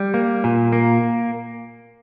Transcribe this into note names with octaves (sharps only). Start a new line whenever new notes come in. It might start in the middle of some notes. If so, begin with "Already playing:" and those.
Already playing: G3
A#3
A#2
A#3